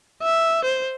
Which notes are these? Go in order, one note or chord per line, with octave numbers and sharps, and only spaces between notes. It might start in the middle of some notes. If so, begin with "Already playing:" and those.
E5
C5